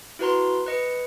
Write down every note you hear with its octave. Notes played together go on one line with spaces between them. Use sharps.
E4 F#4 B4 A#5 C6
B4 D#5 C#7